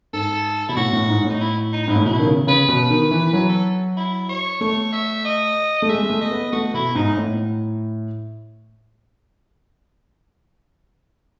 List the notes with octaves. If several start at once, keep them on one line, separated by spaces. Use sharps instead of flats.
G#2 A4
B2 E4
A2 F#4
A2
G#2
A2 D#4
E4
D#4
D#4
G#2 E4
A2
B2 E4
D#3
C#3
C#3 B4
B2 B4
D#3
E3
F#3 B4
A4
E4
C#5
A3 C#5
E5
D#5
A3
G#3 E5
G#3
A3
D#5
B3
A3 F#4
B2 E4
G#2 D#4
A2